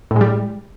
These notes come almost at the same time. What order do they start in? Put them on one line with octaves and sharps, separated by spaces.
A2 G#3 G3